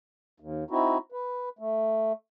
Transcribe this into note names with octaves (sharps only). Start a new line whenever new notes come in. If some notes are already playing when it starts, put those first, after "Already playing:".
D#2
C4 D#4 E4 F#4
B4
A3